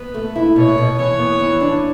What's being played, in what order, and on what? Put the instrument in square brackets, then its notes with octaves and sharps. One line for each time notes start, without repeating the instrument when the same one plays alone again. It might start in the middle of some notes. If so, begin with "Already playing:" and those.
Already playing: [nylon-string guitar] B3 [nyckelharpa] B4
[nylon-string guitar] A3
E4
[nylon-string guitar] B2 [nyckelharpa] C#5
[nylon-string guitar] B2
[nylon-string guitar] E3 [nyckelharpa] C#5
[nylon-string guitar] B3
E3
D4